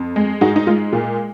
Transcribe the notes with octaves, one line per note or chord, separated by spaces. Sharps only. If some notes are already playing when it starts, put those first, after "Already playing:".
Already playing: F2
G#3
G#2 D#4 F#4
D#4
G#3 F4
A#2 F4